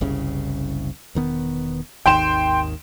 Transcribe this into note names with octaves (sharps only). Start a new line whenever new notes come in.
F#1 C2 C#3
E1 D#3 B3
G#1 D#2 D#3 G5 C6 E7